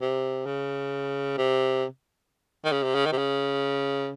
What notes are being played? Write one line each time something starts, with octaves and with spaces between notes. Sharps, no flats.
C3
C#3
C3
D#3
C#3
C3
C#3
D#3
C3
C#3